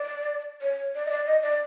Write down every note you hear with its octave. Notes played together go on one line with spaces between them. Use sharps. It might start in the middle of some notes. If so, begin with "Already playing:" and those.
Already playing: D5
C#5
D5
D#5
D5
D#5
D5